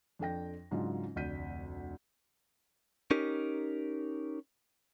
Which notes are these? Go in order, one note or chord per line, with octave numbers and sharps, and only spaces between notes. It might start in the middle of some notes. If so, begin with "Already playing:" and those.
F2 D4 A4 G5 A#6
G#2 C#3 F#3 D4 F4
F1 D2 D5 G6 B6 D#7
C#4 D#4 G4 A#4